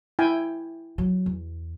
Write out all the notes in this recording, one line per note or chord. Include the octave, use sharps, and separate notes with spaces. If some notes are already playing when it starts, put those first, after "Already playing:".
E4 G5 G#5
F#3
E2